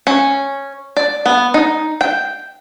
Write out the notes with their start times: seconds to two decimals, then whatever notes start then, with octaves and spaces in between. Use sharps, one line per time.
0.07 C#4
0.97 D5
1.26 B3
1.54 D#4
2.01 G5